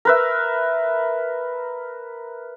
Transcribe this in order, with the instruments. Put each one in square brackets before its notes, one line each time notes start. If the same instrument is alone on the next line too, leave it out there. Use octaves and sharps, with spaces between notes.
[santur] A#4 B4 E5